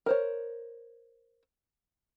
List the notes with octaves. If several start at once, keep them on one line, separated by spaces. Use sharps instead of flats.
A#4 C5 C#5